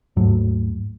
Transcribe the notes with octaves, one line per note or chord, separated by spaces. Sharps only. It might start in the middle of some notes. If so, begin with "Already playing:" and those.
D#2 G#2 F#3 A3